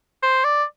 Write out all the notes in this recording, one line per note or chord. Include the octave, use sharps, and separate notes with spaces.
C5
D5